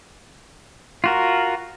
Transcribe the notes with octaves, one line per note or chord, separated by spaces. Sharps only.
F4 F#4 A#4